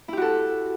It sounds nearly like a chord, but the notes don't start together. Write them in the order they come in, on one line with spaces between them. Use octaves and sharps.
E4 G4 F#4 A4